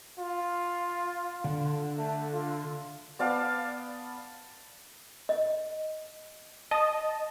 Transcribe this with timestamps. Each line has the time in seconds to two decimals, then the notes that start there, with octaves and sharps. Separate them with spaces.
0.19 F4
1.44 D3
1.98 A3
2.33 F4
3.19 B3 D5 F5 A5
5.29 D#5
6.71 D#5 A5